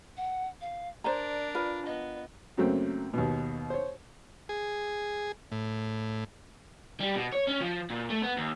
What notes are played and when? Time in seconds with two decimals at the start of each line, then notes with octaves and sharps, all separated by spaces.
0.17 F#5
0.61 F5
1.04 D4 A#4 C5 D5 A#5
1.55 F4 B4
1.86 B3 D#5
2.57 F#2 C#3 F#3 A3 A#3 C4
3.14 D#2 B2
3.70 C5 C#5
4.49 G#4
5.52 A2
7.00 G3
7.15 B2
7.32 C#5
7.47 C#4
7.61 F3
7.90 A#2
8.10 A3
8.22 B3
8.37 D#2